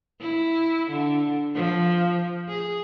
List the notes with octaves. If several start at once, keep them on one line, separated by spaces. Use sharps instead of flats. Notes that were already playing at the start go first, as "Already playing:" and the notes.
E4
D3
F3
G#4